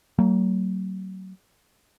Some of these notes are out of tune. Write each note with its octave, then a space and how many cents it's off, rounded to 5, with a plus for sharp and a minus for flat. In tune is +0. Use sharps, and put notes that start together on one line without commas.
F#3 +30 A#3 -40